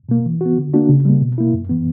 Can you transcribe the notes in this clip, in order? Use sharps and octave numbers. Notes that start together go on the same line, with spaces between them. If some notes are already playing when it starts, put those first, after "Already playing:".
B2 A#3
E3
B3 F#4
D3
A#3 D4 F#4
C#3
G3 A#3
B2
A#3 E4
F#2
E3 B3